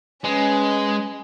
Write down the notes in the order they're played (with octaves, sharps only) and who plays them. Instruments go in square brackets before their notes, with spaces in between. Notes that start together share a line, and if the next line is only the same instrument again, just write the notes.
[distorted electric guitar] G#3 [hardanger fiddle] C#4 B4